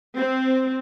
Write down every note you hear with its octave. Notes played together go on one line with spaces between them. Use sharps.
C4